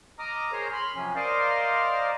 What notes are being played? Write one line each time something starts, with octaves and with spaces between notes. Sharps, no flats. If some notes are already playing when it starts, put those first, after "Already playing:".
D#5 A#5 D6 D#6 F6
G#4 A#4 C5 C#5 A#5
B5 C6 F6
C3 F3 F#3 C#4
A#4 C5 D5 D#5 F5